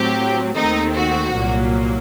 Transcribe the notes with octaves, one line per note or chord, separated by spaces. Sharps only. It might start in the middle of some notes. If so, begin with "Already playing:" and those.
Already playing: A2 F#3 C4 G4
D#2 D#3 A3 C4 D#4
F#4
C2 A#2 F#3 A#3